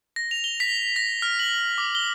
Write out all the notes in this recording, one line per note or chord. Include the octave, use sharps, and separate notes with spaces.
A#6
F7
G7
B6
A#6
F6
F#7
D6
G7